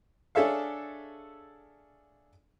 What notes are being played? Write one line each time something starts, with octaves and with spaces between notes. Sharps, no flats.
D4 G#4 A4 C#5 E5 F5